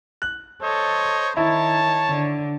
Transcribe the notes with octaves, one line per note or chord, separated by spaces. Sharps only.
F#6
A4 C5 C#5 D#5
D#3 E4 C#5 A5
D3